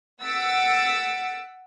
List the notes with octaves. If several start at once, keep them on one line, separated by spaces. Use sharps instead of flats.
F#5 E6 A6 B6 C#7 D7